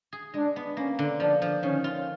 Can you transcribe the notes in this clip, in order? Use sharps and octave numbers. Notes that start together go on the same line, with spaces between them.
G#4
G#3 D4
B3
A#3 C#4
D3
F3 D4
F3
D#3 C#4
F4